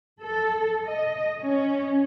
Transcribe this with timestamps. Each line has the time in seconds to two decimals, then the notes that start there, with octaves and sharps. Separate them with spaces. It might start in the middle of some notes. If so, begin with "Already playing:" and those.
0.21 A4
0.88 D#5
1.40 C#4